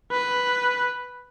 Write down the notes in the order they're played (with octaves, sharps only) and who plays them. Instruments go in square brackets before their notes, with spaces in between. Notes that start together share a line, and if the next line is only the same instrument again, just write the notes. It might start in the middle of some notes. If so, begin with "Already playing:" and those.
[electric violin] B4